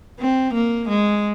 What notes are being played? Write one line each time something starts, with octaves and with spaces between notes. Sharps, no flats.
C4
A#3
G#3